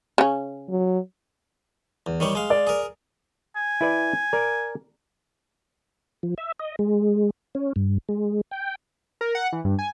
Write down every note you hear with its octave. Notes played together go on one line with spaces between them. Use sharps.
C#3 C#4
F#3
E2
D#3 G3 C#5
G#3 F5
D5
G#4 A#4
G#5
E4 B4 D5
A#4 D5
F3
E5
D#5
G#3
C#4
G2
G#3
G5
A#4
F#5
E3
G2
G#5